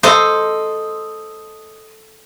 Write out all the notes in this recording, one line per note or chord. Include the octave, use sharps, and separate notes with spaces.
A4 C5 D#5 C6